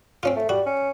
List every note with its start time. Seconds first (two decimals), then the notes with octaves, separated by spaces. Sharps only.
0.23 C4 C#4 F4
0.36 A3
0.49 G3 F#4
0.66 C#4